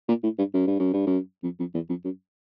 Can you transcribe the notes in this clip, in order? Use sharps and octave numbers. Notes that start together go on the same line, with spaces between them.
A#2
A2
G2
F#2
G2
F#2
G2
F#2
F2
F2
E2
F2
F#2